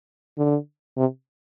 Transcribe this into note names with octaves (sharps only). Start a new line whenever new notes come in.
D3
C3